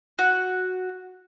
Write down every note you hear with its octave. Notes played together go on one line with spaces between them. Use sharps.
F#4